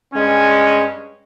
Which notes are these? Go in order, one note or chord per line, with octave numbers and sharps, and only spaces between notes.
G2 G#3 C#4